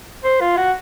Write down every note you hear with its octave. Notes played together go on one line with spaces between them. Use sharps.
C5
F4
F#4